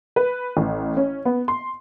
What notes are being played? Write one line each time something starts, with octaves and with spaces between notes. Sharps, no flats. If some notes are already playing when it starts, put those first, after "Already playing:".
B4
A1
C#4
B3
C6